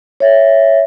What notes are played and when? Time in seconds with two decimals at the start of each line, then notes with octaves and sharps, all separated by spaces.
0.20 C#5 E5